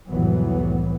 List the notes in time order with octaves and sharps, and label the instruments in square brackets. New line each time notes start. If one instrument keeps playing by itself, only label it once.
[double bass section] F1 C2 A2 E3 F#3 B3